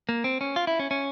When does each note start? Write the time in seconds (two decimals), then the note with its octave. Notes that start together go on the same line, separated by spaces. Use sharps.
0.09 A#3
0.24 C4
0.41 C#4
0.56 F4
0.67 E4
0.79 C#4
0.91 C#4